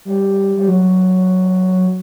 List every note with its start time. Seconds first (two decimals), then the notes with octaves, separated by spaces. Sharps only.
0.05 G3
0.57 G3
0.68 F#3